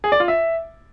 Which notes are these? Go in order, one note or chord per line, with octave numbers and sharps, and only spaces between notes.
G#4
D5
F4
E5